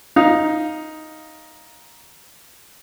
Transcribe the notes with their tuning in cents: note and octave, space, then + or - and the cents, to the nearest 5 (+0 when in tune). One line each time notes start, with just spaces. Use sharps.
D#4 +5 F5 +0